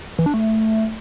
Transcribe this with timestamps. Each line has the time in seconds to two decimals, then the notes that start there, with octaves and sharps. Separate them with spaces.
0.19 E3
0.26 D4
0.34 A3